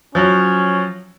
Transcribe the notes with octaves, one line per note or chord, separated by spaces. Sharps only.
F3 F#3 C#4